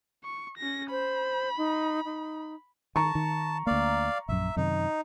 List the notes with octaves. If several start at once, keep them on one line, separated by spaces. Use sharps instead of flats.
C#6
C#4 A#6
C5 B5
D#4
D#4
D#3 A5 A#5 C#6
D#3
D2 A#3 D5 F5
A#1 F#2 E5
F#2 C3 D#3 D#4